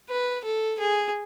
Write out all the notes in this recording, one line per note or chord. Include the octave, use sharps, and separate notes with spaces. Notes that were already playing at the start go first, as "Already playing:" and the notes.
B4
A4
G#4